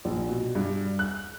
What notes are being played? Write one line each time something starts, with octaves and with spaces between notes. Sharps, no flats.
A#1
B2
G2
F#6